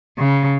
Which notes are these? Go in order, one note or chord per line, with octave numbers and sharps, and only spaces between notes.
C#3